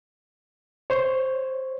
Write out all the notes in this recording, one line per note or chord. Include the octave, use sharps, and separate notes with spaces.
C5 C#5